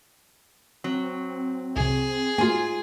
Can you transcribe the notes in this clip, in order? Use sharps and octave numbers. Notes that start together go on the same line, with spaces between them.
F#3 C4
C2 C3 G#4
G#2 A3 A#3 F4 F#4 G#5